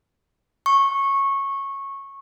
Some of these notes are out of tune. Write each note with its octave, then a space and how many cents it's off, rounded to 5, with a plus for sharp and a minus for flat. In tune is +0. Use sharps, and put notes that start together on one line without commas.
C#6 -15